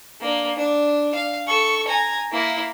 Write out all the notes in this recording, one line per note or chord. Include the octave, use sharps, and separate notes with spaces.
A#3 D4
D4
F5
A4 C#6
G#5 A#5
A#3 E4